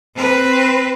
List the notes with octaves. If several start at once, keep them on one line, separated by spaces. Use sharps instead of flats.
C4 B4